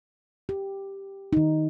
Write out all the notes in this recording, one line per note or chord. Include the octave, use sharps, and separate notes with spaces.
G4
D#3 D#4